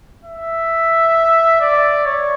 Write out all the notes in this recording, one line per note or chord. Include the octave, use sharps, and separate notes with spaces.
E5
D5
C#5